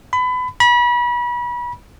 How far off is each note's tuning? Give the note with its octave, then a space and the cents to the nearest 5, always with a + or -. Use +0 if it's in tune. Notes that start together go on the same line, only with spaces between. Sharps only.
B5 +25
B5 -35